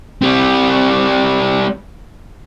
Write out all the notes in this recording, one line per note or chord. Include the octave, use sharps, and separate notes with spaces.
G3 C4